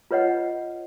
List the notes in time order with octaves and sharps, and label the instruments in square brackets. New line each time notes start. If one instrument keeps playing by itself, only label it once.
[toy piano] F4 B4 C#5 D#5 F#5